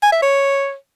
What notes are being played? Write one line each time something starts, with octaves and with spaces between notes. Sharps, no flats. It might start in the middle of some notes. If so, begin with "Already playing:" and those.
G#5
E5
C#5